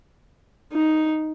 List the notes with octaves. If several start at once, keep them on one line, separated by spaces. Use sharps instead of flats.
D#4